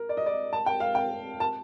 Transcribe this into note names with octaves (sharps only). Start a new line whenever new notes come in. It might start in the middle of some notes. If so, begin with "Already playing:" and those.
Already playing: A#4
D5
D#5
D5
A5
G5
F5
G5
A5